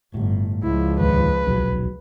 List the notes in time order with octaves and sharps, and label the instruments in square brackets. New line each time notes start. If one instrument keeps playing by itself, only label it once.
[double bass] G1 [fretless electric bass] A2
[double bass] C#2 F3 [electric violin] E4
[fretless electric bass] D#2 G#2 D3 [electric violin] B4
[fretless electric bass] D#1 B1 F#3